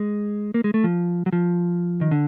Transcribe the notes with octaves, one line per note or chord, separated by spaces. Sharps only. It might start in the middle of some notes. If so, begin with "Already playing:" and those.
Already playing: G#3
A#3
G#3
A3
F3
F#3
F3
D#3
D3